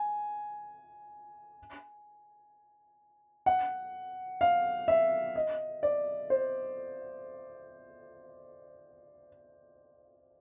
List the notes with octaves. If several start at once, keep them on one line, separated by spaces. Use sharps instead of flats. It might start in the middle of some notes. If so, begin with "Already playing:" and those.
Already playing: G#5
F#5
F5
E5
D#5
D5
C5